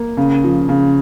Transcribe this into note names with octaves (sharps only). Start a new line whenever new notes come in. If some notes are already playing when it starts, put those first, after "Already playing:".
Already playing: A#3
C#3
F3
C#3